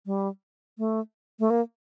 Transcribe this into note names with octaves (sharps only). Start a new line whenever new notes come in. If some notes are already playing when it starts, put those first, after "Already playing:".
G3
A3
A3
A#3